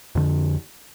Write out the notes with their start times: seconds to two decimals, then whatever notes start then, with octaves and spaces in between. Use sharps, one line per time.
0.15 F2 D3